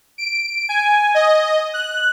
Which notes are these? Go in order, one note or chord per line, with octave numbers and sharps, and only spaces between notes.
D7
G#5
D#5
F#6